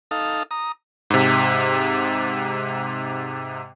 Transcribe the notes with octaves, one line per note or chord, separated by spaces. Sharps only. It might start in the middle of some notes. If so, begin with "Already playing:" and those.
D#4 A4 F5
A#5 D#6
G#2 C3